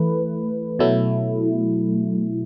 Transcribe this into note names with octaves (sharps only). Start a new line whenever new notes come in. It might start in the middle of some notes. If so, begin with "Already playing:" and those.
Already playing: E3 A3 B4
B2 F#3 A3 E4